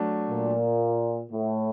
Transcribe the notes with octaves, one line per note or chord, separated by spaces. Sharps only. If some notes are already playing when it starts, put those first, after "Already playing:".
Already playing: F#3 A3 D4
A#2
A2